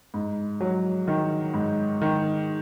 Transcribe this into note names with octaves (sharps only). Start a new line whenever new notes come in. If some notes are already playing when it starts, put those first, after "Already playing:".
G#2
F#3
D#3
G#2
D#3